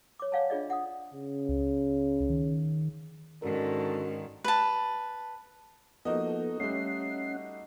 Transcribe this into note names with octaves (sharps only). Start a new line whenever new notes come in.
C#5 D6
C#5 D5 F5 F#5 G#5 A5
D4 F4 G#4 D5 D#5
F#5 D#6
C#3
C#2
D#3
G#2 D3 D#3 C#4 F#4 A#4
B4 A5
F3 A#3 B3 D#4 F#4 A4 D#5
G3 A3 C#4 F#5 C7